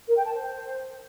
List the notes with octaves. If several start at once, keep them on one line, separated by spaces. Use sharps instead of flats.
A#4
G5
A5
C5